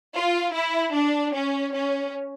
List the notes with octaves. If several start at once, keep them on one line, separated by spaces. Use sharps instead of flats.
F4
E4
D4
C#4
C#4